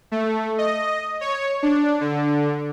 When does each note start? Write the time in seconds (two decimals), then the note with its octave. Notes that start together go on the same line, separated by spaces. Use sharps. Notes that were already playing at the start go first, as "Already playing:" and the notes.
0.12 A3
0.58 D#5
1.21 C#5
1.63 D4
2.01 D3